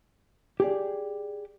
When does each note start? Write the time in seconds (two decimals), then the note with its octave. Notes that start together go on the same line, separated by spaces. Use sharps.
0.60 G4 G#4 D5